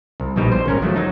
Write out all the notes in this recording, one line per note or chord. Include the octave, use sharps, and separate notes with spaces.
C2
A#1 B2 G3 D#4
C5
G#1 C#4 A#4
F3 F#3 A3
F#3 D#4